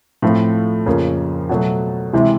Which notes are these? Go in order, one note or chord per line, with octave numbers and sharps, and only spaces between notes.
A2 F3 A3 C4 F4
F2 C#3 F3 A#3
B2 F#3 A3
C3 E3 G#3 C4 E4